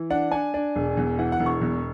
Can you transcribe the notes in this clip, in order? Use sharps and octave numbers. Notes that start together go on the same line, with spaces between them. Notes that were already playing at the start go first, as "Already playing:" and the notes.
Already playing: E3
D4 F#5
D4 G#5
D4
E1
E2
E3 F#5
F#5
E1
C#6
E2